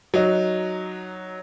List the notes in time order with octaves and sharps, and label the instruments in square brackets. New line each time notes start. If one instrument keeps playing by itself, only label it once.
[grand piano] F#3 D#4